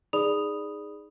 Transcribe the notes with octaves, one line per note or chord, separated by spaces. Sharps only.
D#4 G#4 D5 B5 D#6 F7